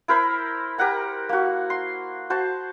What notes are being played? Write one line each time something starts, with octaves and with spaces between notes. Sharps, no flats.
E4 A#4 C5 B5
G4 A#4 F#5 A#5
A#3 F#4
C6
F#4 C5 A5